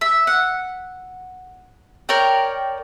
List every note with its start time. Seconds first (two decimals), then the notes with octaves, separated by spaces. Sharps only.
0.01 E5
0.27 F#5
2.09 A#4 C#5 D5 G5